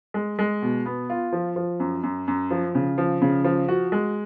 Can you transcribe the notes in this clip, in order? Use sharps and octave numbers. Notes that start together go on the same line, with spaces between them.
G#3
G#3
B2
B3
F4
F3
F3
F#2
F#2
F#2
F3
C#3
F3
C#3
F3
F#4
G#3